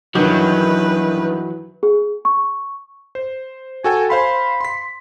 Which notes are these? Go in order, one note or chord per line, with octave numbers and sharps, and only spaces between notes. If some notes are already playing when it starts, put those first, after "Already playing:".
G2 D#3 E3 F#3 B4
G#4
C#6
C5
F#4 A4 G5 G#5
C5 F5 B5 C6
C6 B6